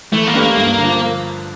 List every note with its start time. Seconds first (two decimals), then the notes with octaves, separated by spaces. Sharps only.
0.12 E3 A3
0.27 A#3
0.34 A3 D4 G4 B4
0.41 A#3
0.56 G2
0.78 D3 F3